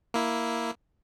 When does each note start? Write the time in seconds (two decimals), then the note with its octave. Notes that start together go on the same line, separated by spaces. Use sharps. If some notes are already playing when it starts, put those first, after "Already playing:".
0.14 A#3 E4